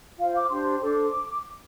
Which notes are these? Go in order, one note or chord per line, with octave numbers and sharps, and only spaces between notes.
F4 C5 F5
D6
D4 G4 C5 C6
D4 A4 C5 D6